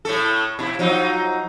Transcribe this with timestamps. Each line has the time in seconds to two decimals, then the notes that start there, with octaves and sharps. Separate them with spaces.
0.05 A2 A3 A4
0.59 B2 E4
0.79 F3 F#3 D#4